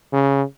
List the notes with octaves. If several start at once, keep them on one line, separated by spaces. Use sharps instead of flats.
C#3